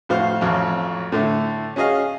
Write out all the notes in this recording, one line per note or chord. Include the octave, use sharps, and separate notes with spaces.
F2 A2 F#4 C5 F5
A1 F2 F#3
A2 D3 A3
C#4 F#4 G#4 D#5 F5